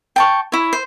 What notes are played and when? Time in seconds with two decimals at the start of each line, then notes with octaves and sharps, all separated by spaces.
0.16 G5 A5 C#6
0.52 E4 C#5
0.73 C5